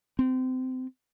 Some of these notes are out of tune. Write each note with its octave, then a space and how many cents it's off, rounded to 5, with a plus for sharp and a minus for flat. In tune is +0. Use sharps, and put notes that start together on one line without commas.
C4 -25